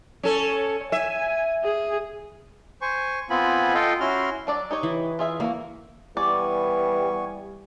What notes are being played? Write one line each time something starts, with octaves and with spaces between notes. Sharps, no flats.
C#4 A4
C#5
E5 G#5
G#4
C5 G#5 C#6
B3 C4 F4 G#5 B5
F4 A4 D#5 F5 G5
C#4 E4 F#4 C6 F6
F#3 D4 D5
D#4 G4 C#5
E3
F4 G#4 E5
G3 A#3 F#4
E3 G3 B3 D5 G#5 C#6